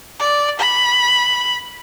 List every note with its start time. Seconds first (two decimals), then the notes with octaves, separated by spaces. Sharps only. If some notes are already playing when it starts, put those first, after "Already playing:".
0.19 D5
0.59 B5